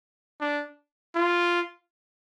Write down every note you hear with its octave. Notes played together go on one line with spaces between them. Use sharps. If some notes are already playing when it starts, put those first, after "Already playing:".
D4
F4